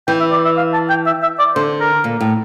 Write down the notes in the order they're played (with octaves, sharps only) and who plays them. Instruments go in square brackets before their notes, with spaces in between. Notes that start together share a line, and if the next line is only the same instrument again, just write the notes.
[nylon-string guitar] E3 [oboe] G5
[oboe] E5
D5
E5
F5
A5
G5
E5
E5
D5
[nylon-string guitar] D3 [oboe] C5
[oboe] A#4
[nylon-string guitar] A#2
A2